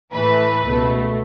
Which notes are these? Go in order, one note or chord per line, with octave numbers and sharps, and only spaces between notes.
A2 E3 A3 B4
C#2 B2 A3